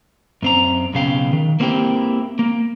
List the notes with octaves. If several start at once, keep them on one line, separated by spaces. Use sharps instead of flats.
F#2 C4 A#5
B1 C#3 F5 G5
D#3
A#3 C4 E4 G4 F#5 G5
A#3